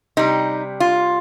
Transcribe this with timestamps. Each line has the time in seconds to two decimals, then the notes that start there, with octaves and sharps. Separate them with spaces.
0.17 C3 G3 D#4
0.80 F4